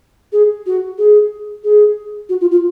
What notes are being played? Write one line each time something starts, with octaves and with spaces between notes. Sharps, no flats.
G#4
F#4
G#4
G#4
F#4
F4
F4